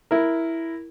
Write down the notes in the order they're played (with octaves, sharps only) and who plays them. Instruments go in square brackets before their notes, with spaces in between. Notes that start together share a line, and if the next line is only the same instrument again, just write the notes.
[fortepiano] E4 A#4